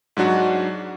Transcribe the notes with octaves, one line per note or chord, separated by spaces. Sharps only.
G#2 F#3 D4 F#4